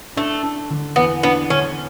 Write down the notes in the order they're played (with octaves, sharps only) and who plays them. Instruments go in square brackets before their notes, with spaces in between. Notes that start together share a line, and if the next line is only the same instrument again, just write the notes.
[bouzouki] A3 [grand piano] D4
[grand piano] D4
D3
[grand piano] E2 [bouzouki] B3
[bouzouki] B3 [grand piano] D4
[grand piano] D3 [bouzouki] C#4